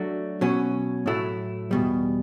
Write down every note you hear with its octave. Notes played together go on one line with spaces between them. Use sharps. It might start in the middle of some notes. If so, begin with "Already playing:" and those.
Already playing: F#3 A3 D4 F#4
B2 F#3 C#4
A2 F#3 A3 E4
E2 B2 G3